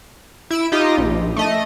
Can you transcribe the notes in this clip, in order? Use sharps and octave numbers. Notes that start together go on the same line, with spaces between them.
E4 E6 D7
D#4 F4 G4 D#5
A#1
A3 D#5